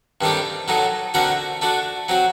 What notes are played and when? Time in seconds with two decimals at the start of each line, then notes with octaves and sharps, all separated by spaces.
0.21 G2 D#3 A3 C4 G4
0.68 A2 F#3 A3 D#4
1.14 D3 A3 C4 F#4 A#4
1.62 A3 D4 F#4
2.08 F#3 C4 F#4